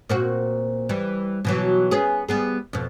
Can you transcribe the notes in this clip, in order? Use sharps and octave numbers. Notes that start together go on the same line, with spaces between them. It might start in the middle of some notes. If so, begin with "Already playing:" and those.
A#2 C4 F#4
E3 G3
B2 E3 F#3
B3 C#4 G#4
G3 B3 G#4
F2 B2